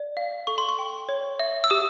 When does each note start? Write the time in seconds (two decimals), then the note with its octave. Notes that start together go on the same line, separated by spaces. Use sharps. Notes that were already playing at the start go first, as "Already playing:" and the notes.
Already playing: D5
0.17 F5
0.47 A4 C#6
0.58 C6
0.69 C#6
0.79 G5
1.09 C#5
1.39 E5
1.64 E6
1.70 G4 D#6